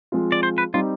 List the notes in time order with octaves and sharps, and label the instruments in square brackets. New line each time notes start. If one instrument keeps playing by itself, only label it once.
[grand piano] F3 G#3 C4 F4
[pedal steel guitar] D5
C5
B4
[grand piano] G3 C4 D#4 G4 [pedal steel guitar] F4